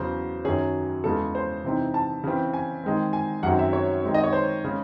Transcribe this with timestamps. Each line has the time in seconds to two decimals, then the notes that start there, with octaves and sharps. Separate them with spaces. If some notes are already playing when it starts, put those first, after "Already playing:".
Already playing: E2 C#3 F#3 C5
0.44 F#2 D#3 F#3 C#4 G#4
1.04 E2 C#3 G#3 A4
1.35 C5
1.64 C3 E3 C4 D#4
1.94 A5
2.24 C#3 E3 C4
2.53 G#5
2.84 D#3 G#3 C4
3.13 G#5
3.43 F#2 D#3 F#3 C4 F#5
3.59 E5
3.73 C#5
4.03 D#3 G#3 C4
4.14 D#5
4.24 C#5
4.33 C5
4.63 C#3 G#3 C#4